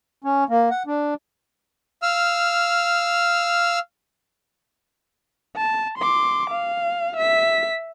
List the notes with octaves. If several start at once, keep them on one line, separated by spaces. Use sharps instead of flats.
C#4
A#3
F#5
D4
F5 E6 F6
A5
C6 D6
F5
E5 B6